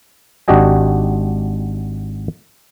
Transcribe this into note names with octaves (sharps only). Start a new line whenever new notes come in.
G#1 D4 F#4 G4 D#5 G#5